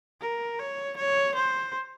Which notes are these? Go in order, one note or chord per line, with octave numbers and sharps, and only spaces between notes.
A#4
C#5
C#5
C5